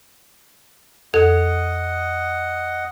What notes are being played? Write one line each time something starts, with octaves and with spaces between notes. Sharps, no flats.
F2 A4 D#5 F#5